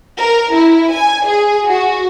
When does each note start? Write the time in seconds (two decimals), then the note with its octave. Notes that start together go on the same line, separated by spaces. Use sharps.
0.18 A#4
0.52 E4
0.92 G#5
1.25 G#4
1.66 F#4